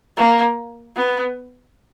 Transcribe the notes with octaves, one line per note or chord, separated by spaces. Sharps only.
A#3
B3